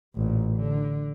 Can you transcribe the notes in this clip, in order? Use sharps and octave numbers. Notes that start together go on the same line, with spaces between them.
A1 A#2
D3